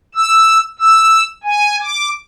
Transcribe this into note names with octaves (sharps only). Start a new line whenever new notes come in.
E6
E6
G#5
D6